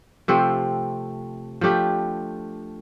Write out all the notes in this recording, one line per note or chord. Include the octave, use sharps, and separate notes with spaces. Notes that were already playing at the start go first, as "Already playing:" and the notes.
C3 F3 A3 C4
F3 A3 D4 G4